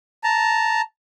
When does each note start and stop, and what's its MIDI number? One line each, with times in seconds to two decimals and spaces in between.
0.24 0.81 81
0.24 0.81 82